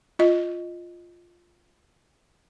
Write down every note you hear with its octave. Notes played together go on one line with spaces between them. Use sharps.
F4 D#5